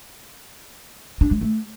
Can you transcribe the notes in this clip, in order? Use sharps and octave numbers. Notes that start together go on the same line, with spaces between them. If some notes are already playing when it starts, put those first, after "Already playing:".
D4
G#3
A3